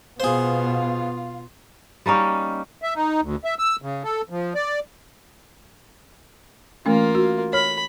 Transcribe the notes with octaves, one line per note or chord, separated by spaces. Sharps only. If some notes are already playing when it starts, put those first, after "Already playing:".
B2 B3 F4 G#4 C5 F5
G3 A#3 C#4 D#4
E5
D#4
D2
E5
E6
C#3
A4
F3
D5
E3 A3 A#3 C#4 F4
F#4
C#5 B5 F6